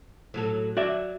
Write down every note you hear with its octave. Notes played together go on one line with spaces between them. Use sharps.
A2 F#3 A4
F#3 F#4 D5 E5